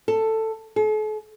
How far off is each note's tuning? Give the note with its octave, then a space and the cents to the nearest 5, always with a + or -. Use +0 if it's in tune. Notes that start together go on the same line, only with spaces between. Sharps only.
A4 +10
A4 -45